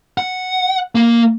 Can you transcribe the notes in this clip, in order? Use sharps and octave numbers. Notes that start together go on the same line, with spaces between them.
F#5
A#3